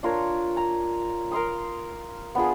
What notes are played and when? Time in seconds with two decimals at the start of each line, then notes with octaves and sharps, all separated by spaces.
0.03 D4 F4 A#4 C#5
0.57 A#5
1.32 A#4 F5 C6 D#6
2.35 B3 D4 F4 G#4